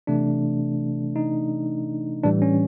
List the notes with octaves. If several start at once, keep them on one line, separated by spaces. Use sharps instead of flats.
C3 E3 A3 D4
D#4
A2 E3 G3 D4
C#4